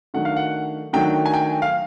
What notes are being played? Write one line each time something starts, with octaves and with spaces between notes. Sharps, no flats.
D#3 F#3 A3 D4 F#5
F5
F#5
D#3 F#3 A3 D4 G5
G#5
G5
F5